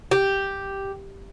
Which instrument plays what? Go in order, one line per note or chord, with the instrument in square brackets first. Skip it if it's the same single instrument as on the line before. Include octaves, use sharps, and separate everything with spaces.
[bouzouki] G4